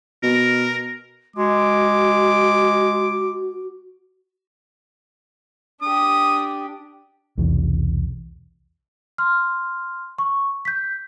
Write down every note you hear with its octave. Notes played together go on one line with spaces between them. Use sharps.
B2 A#4
G#3 F#4 D6
D4 G4 D#6
B1 E2 C3 E3
C6 F6
C#6
G6 B6